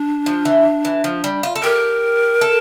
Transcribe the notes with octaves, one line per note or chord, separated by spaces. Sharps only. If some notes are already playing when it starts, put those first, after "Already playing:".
Already playing: D4
F3
E3
E3
F3
G3
F4
A4
G4 A#4
A4